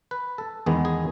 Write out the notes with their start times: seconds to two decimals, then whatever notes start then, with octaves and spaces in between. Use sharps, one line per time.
0.11 B4
0.38 A4
0.66 E2 D#3 G#3 B3 G#4
0.85 G#4